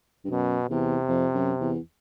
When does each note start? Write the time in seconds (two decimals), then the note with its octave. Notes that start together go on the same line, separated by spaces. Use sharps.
0.25 G2
0.30 F#2 B2
0.70 E2 C3
1.08 F2
1.34 F#2
1.60 E2